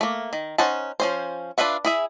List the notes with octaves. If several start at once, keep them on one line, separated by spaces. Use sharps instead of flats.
A3 A#3
D#3
C#4 D#4 C5 F#5 A5
F3 C#4 C5
D4 F4 B4 E5 F#5
E4 G#4 E5